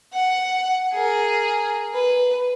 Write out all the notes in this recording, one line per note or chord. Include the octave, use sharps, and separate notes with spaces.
F#5
G#4 A#4
B4